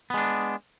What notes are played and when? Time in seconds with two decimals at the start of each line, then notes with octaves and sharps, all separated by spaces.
0.10 B3
0.14 G#3
0.17 D4